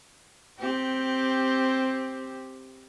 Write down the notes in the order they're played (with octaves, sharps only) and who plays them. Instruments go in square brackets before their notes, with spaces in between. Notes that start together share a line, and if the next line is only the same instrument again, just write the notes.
[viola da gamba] C4 G4